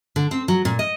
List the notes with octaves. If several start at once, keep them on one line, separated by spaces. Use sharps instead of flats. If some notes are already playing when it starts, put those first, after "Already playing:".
D3
C4
F#3
A#2
D#5